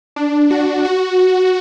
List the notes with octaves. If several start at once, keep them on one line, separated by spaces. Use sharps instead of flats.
D4
F#4
F#4